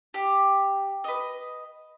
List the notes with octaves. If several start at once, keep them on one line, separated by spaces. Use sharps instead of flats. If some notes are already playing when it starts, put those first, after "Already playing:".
G4
B4 D#5